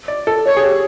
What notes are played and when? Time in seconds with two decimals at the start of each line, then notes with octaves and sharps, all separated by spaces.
0.08 D5
0.27 A4
0.46 A4 C#5
0.57 G#4
0.63 G4